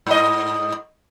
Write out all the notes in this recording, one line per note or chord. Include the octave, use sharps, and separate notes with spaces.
G#2 D#5